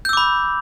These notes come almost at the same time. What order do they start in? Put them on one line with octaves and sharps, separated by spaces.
G6 E6 D6 B5